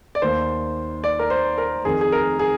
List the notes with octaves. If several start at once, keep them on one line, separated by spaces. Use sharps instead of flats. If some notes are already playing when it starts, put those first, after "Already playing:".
D5
D#2 D#3 C5
D5
A#4
C5
A#4
F2 D#3 G#4
G#4
A#4
G#4